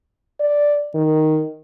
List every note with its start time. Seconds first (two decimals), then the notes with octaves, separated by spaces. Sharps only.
0.40 D5
0.95 D#3